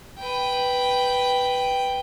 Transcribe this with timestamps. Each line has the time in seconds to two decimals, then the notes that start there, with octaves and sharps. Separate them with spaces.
0.19 B4 G5